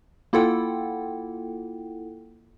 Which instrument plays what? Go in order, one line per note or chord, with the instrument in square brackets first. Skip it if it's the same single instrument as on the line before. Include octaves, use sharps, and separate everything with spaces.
[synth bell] A#3 E4 F4 A4 F#5 G5